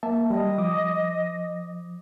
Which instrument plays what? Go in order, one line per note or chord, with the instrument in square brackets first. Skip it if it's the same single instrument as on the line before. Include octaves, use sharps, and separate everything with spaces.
[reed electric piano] A#3 E5 A5
[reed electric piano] G3 [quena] D#5
[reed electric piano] F3 D6 D#6